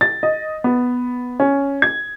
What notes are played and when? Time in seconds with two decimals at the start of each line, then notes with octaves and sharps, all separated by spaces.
0.01 A6
0.23 D#5
0.64 B3
1.40 C#4
1.82 G#6